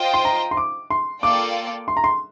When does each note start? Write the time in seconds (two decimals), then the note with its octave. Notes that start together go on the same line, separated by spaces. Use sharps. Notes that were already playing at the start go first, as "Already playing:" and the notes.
Already playing: F4 C5 D#5 G5
0.14 C6
0.25 A#5
0.51 C6
0.57 D6
0.90 C6
1.23 A#3 F4 A4 D5 G5 D6
1.88 C6
1.97 A#5
2.04 C6